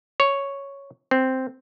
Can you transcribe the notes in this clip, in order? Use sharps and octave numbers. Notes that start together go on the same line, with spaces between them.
C#5
C4